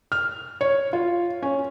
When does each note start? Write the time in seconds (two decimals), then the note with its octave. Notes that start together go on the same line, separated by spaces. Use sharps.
0.12 F6
0.61 C#5
0.93 F4
1.42 C#4